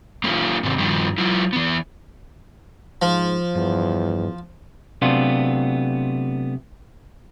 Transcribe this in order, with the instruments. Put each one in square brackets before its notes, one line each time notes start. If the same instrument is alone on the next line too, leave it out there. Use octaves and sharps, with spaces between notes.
[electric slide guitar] A#3 C#4 E4 F4
G#2 C3 D#3
G2 D#3 F3 G3
F#3 E4 F4
E3 B3
[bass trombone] G#2 [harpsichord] F3
[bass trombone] E2 [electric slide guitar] G2
[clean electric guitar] C3 F#3 A3 B3 D4 F4